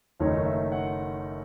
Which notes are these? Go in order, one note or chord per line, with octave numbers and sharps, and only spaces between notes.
F#1 F#2 D#3 A3 D#4 C#5
E5
F#5